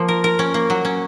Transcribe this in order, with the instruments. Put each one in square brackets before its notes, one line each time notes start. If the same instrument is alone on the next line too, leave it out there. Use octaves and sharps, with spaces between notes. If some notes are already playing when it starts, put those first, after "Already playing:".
Already playing: [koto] F3 A#3
A#4
A#4
C#4
A#3
F#3
C#4